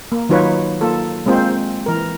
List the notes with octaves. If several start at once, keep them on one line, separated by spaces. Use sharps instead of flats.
A#3
D#3 F#3 D#4 F4 B4 C#5
A#3 F4 A4
G#3 A#3 C4 F4 C5
E3 A#4